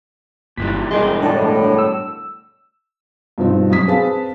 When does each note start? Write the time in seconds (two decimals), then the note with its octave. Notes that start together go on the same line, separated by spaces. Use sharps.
0.57 G1 A#2 E3 G3 B6
0.91 E1 G2 G#4 A#4 D#5 C6
1.22 A2 D3 D4 A5
1.78 E6
3.38 G2 B2 F3 C4 D#4
3.71 F#2 D#6 B6
3.88 C4 G#4 B4 F5 A5